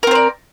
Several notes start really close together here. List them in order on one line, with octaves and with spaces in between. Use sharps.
A#4 C4 C5 D5